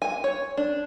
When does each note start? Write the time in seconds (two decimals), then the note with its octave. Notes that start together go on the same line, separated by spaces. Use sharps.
0.02 G#5
0.24 C#5
0.57 D4